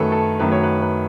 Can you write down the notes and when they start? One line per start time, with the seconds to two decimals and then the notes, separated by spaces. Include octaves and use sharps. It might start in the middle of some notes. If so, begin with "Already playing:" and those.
Already playing: F#2 D#3 A3 A4 B4 C#5
0.12 A4
0.39 F#2 D#3 F#3 A3 B4
0.52 C#5
0.63 B4
0.82 B4